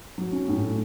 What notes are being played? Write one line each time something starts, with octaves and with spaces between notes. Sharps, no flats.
F#3
C#4
A2